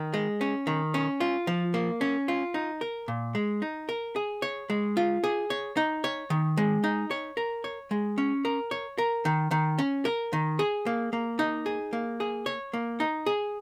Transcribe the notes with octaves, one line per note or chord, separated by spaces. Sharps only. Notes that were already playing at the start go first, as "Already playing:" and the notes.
Already playing: D#3
G#3
C#4
D#3
C#4
F4
F3
A#3
C#4
F4
D#4
A#4
A#2
G#3
D#4
A#4
G#4
C#5
G#3
F4
G#4
C#5
D#4
C#5
D#3
G#3
D#4
C#5
A#4
C#5
G#3
C#4
A#4
C#5
A#4
D#3
D#3
C#4
A#4
D#3
G#4
A#3
A#3
D#4
G#4
A#3
G#4
C#5
A#3
D#4
G#4